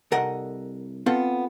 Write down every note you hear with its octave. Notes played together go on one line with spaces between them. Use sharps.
C2 A4 A#4 D#5 F#5
B3 C4 F4 A4